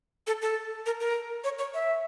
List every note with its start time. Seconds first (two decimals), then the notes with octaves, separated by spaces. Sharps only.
0.27 A4
0.42 A4
0.86 A#4
1.00 A#4
1.44 C#5
1.59 C#5
1.74 E5